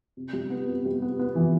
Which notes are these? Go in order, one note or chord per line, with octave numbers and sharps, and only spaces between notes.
C3
G3
B3
C3
G3
B3
B3
E3